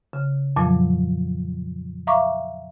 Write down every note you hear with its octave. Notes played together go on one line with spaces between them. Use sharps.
C#3
F2 A#2 F3 F#3
E5 F5 A#5 C#6 D6